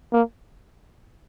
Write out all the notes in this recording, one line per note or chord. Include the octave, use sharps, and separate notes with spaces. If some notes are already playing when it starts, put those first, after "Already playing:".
A#3